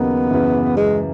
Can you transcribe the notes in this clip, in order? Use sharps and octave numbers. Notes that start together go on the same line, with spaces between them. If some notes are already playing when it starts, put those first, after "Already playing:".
Already playing: D#2 C#3 F#3 A#3 B3 D#4
F#2 C#3 E3
G#3